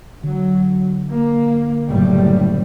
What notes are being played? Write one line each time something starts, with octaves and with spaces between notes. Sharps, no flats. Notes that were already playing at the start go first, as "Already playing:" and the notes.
D3 F#3
A#3
F#1 A2 G3